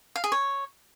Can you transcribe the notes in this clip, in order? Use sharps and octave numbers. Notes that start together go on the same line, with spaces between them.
F5
G#4
C#5